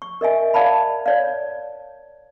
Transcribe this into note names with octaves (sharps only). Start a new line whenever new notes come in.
C#6
A#4 D#5 E5 G#5
D5 F5 A5 B5
C#5 D5 F5